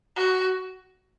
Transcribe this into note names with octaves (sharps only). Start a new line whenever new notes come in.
F#4